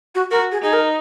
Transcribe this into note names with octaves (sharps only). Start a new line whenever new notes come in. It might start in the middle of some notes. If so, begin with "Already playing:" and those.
F#4
F#4 A#4
G#4
D#4 G#4
A#4